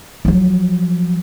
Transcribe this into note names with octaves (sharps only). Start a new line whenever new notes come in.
F3 F#3